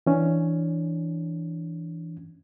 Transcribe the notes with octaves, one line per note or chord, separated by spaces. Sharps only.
E3 C#4 D4